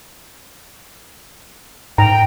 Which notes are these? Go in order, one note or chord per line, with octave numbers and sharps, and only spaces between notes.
G#2 G5 A#5